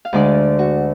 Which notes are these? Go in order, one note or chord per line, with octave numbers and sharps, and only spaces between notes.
F5
D2 D3 G#3 D4 D5
F#4